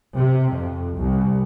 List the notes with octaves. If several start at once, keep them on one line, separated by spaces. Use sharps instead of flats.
C3
F2
C2